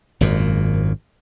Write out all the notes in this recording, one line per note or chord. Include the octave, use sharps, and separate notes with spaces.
G#1 F#2 A#2